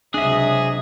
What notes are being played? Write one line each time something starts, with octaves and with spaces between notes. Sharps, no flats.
C#2 C3 F#3 D4 G#4 D#5 E5